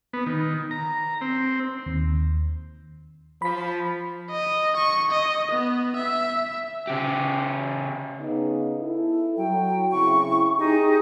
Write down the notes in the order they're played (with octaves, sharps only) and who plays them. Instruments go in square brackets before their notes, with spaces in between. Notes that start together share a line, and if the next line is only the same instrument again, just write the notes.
[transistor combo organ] B3
D#3
A#5
C4
[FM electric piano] D#2
[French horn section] F3 [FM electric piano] B5 B6
[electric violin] D#5
C#6
D#5
B3
E5
[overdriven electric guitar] C#3 G4
[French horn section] C#3 B3 D#4
E4 A4
[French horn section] F#3 [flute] G5
[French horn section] C#3 C4 E4 [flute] C#6
[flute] D#4 [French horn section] G4 G#4